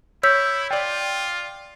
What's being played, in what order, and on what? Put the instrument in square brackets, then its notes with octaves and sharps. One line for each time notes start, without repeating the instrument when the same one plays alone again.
[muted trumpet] E4 [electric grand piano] C#5 [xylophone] E6 G6 B6
[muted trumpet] F4 [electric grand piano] D5 G5